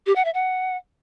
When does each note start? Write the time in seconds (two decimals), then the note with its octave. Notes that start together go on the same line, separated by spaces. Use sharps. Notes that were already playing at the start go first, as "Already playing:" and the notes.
0.06 G4
0.16 F#5
0.25 E5
0.34 F#5